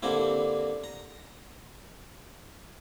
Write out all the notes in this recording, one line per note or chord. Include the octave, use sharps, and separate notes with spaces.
D3 G3 A#3 C4 E4
A#5